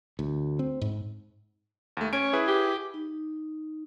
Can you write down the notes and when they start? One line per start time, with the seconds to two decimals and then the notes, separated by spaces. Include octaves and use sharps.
0.19 D2
0.59 C4
0.81 G#2
1.97 D#2 A3
2.13 C#4 C#5 D7
2.33 E4 G#4 B4
2.48 G4
2.94 D#4